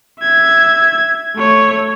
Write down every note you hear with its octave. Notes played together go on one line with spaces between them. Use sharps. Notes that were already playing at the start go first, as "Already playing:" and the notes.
E5 G#6
A3 C#5